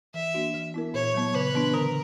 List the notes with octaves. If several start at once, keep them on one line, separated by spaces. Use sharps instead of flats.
E3 E5
A#3 D4 F#4
E3
B3 E4 A#4
A#2 C#5
F#3 B3
C#3 B4
E3 B3 D4
D3 A#4